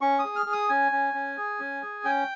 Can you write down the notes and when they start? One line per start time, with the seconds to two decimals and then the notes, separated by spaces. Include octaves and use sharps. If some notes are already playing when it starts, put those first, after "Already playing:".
0.01 C#4 C#6
0.19 D#6
0.25 G#4
0.36 F6
0.46 G#4
0.53 D#6
0.69 C#4 G#5
0.92 C#4
1.14 C#4
1.38 G#4
1.60 C#4
1.83 G#4
2.04 C#4 G5